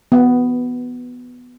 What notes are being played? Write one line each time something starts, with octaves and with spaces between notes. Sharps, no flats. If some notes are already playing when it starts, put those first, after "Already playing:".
B3